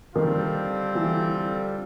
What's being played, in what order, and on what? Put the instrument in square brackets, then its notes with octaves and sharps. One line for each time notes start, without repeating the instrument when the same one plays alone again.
[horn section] D3 G3 C4 F4 A4 [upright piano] D#3
[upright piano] E3